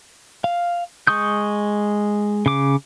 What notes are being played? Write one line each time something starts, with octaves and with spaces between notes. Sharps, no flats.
F5
G#3 C#6 D#6 G6
C#3 D6